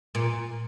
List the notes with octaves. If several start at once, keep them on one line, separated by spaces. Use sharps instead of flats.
A#2